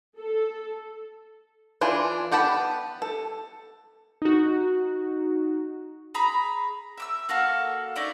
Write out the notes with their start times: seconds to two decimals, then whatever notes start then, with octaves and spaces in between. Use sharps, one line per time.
0.18 A4
1.81 E3 D4 F4 G#5
2.32 B3 G4 F#5 A5 B5
3.02 A4
4.22 D#4 F#4
6.15 G#4 A#5 B5
6.98 E5 D6 E6
7.29 A#3 F#4 A4 F5
7.96 C#4 D#4 D5 E5